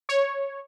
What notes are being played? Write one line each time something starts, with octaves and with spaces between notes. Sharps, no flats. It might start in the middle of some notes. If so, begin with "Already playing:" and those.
C#5